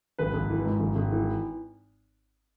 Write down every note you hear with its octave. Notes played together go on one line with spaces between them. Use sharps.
G#1 B4
G#1
E3
G#2
G#1
G#1
E3